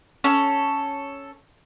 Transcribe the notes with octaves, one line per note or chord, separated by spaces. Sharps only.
C#4 A4